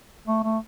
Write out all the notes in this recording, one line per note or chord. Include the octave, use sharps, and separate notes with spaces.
A3
A3